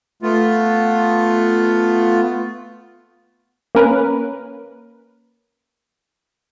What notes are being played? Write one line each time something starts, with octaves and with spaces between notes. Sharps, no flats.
A3 B3 F4
A#3 C#4 A#4 B4